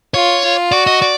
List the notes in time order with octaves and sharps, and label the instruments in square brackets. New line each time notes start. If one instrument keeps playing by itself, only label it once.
[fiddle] F4 [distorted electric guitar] C#5
[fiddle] F4
[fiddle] F#4 [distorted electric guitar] D5
[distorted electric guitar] D#5
D5